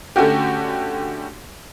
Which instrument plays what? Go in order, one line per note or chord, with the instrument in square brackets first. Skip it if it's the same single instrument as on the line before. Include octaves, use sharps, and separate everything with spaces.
[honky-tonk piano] D3 A3 C#4 F#4 G4